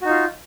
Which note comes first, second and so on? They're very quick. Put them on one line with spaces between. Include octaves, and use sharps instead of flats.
F#4 D#4 F4